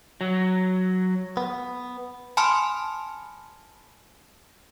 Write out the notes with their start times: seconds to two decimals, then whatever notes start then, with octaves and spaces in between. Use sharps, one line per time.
0.21 F#3
1.37 B3
2.37 G#5 A5 B5 C6 D#6 F6